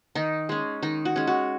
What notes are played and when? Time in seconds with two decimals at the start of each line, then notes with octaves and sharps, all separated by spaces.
0.15 D#3 D#4
0.49 G#3 C#4
0.82 D#3 D#4
1.05 F#4
1.16 G#3 C#4
1.27 F#4